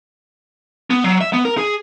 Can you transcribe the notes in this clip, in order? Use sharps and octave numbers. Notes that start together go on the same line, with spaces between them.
B3
F#3
E5
B3
A#4
G#4